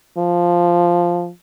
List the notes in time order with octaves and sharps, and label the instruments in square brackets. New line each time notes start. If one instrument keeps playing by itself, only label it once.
[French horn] F3